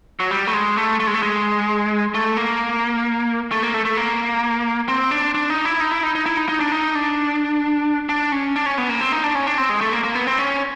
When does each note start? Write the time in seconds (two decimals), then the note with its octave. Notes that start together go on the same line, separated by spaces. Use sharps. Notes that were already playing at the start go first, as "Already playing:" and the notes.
0.20 F#3
0.31 G3
0.47 A3
0.54 G#3
0.77 A3
1.00 A3
1.07 G#3
1.14 A3
1.23 G#3
2.14 A3
2.37 A#3
3.52 A3
3.63 A#3
3.74 A3
3.85 A3
3.97 A#3
4.88 C4
5.11 D4
5.35 D4
5.50 D#4
5.65 E4
5.80 D#4
5.91 E4
6.03 D#4
6.15 D#4
6.26 E4
6.37 D#4
6.49 D#4
6.60 D4
6.72 D#4
6.95 D4
8.09 D4
8.32 C#4
8.56 D4
8.66 C#4
8.78 B3
8.89 A#3
9.01 C4
9.12 D#4
9.24 D4
9.35 C#4
9.47 D4
9.58 C4
9.69 G#3
9.81 A3
9.92 A#3
10.04 A#3
10.15 B3
10.27 C4
10.39 C#4